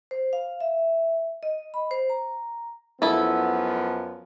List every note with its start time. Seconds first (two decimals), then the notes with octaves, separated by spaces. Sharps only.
0.11 C5
0.33 F5
0.60 E5
1.43 D#5
1.74 B5
1.91 C5
2.10 A#5
3.02 F#2 F3 B3 E4 A4